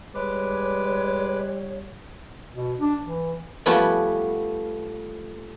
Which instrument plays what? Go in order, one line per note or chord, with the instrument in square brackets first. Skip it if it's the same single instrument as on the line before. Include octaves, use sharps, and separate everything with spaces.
[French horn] G3 [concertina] G#3 B4 D6 [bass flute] C#5
[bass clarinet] B2
D4
E3
[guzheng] F3 G3 A3 B3 C#4